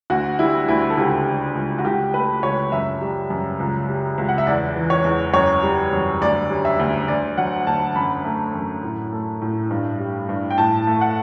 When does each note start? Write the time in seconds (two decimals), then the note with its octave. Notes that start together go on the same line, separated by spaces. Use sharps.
0.10 D2 F#4
0.39 G3 E4
0.68 D2 E4
0.90 A4
0.97 C#2 G4
1.26 G3
1.55 C#2
1.78 F#4
1.85 C#2 G4
2.14 A3 B4
2.43 C#2 C#5
2.72 F#2 E5
3.01 G3
3.30 F#2
3.59 C#2
3.89 G3
4.18 C#2
4.29 F#5
4.38 E5
4.47 E2 D5
4.76 E3
4.90 C#5
5.04 E2
5.34 F#2 C#5
5.63 G3
5.93 F#2
6.21 D2 D5
6.50 G3
6.65 E5
6.79 D2
7.08 D2 D5
7.37 F#3 F#5
7.67 D2 A5
7.96 F#2 B5
8.25 A3
8.54 F#2
8.83 A2
9.13 A3
9.41 A2
9.71 G2
10.00 G3
10.29 G2
10.50 G5
10.58 A2 A5
10.87 A3
11.01 F#5